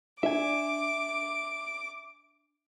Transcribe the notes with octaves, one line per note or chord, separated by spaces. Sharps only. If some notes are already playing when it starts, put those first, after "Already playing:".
D4 E5 G#5 D6